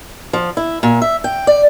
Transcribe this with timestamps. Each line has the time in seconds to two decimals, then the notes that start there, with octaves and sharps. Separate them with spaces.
0.33 F3
0.57 E4
0.83 A#2
1.02 E5
1.24 G5
1.47 D5